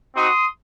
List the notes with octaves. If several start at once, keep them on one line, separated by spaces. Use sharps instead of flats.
C4 D#4 F#4 C6 D#6